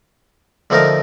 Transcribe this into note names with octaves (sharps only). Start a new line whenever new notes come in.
D3 F3 A3 D#4 A#4